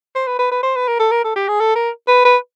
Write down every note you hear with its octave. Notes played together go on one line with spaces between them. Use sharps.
C5
B4
B4
B4
C5
B4
A#4
A4
A#4
A4
G4
G#4
A4
A#4
B4
B4